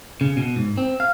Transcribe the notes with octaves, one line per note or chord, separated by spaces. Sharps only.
C#3
B2
G#2
C4
F5